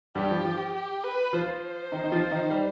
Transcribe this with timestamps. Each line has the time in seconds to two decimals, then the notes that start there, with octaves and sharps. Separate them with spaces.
0.15 G2 G3 G4
0.31 F3
0.45 F3
0.75 G4
1.04 B4
1.33 F3 F4 C5
1.92 D#3 D#4
2.04 D#4
2.12 F3 F4
2.31 D#3 D#4
2.51 G3